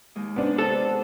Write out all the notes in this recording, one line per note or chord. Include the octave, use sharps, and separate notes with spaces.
D#2 G#3 D#4
C3 B3 C4 D4
A4